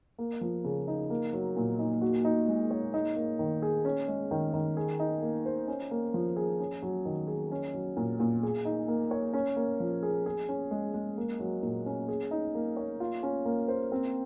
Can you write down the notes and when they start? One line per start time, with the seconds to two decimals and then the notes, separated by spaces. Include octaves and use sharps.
0.18 A#3
0.41 F3
0.64 C#3
0.88 D#4
1.10 A#3
1.33 F#3
1.56 A#2
1.79 D#4
2.01 F#4
2.25 D#4
2.48 G#3
2.71 C#5
2.94 D#4
3.16 A#3
3.39 D#3
3.62 G#4
3.85 C#4
4.08 G#3
4.31 D#3
4.53 D#3
4.77 G#4
5.00 D#4
5.22 A#3
5.45 C5
5.68 C#4
5.91 A#3
6.14 F3
6.36 G#4
6.60 C#4
6.82 F#3
7.05 D#3
7.27 G#4
7.52 C#4
7.73 F#3
7.97 A#2
8.20 A#2
8.43 G#4
8.65 D#4
8.88 A#3
9.11 C#5
9.33 C#4
9.56 A#3
9.80 F3
10.03 G#4
10.26 G#4
10.49 C#4
10.71 G#3
10.94 G#3
11.17 A#3
11.40 F#3
11.63 A#2
11.86 C#4
12.08 G#4
12.31 D#4
12.55 A#3
12.77 C#5
13.00 F4
13.23 C#4
13.45 A#3
13.68 C5
13.92 C4